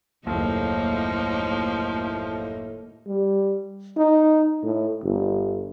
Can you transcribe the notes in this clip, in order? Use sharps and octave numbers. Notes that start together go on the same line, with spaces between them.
F#1 D#2 A2 F3 A#3 D#4
G3
D#4
A2
G1